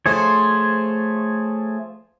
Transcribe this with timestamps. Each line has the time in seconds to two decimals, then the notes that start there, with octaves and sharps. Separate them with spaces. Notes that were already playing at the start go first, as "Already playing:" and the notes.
0.06 F3 A3 G#4 C5 C#5